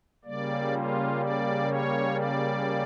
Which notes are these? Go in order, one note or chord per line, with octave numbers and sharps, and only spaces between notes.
C#3 G3 A#3 D5
F4
D5
C#5
D5